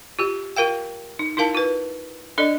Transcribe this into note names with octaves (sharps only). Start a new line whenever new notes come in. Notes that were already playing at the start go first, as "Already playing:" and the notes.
F4 G4
F4 A#4 F5 G5
D#4
D#4 E4 A#4 F5 A5
F4 B4
D4 A4 D5 D#5